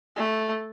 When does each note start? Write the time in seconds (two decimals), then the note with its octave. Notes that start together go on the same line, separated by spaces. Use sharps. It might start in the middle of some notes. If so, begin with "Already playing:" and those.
0.16 A3